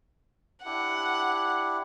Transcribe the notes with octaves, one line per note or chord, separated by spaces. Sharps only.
D4 E4 G4 F#5